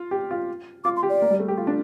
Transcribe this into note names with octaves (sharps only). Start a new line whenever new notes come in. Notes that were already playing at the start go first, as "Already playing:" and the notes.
Already playing: F4
G4
F4
F4 D6
C6
G4
D5
A#3
G3
A3
G4
F4
D4